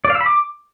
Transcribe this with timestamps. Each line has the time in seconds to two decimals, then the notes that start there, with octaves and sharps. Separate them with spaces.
0.05 D5
0.10 F5
0.15 E6
0.21 B5
0.26 D6